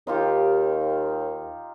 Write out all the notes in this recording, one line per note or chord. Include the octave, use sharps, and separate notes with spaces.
D#2 D#4 F4 G4